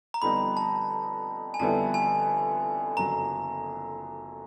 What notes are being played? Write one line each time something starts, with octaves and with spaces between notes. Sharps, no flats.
A#5
F2 D3 G3 B3 D#4 B5
A5
G#5
F2 D3 G3 B3 E4 A5
G#5
F#1 F2 D3 F#3 A#5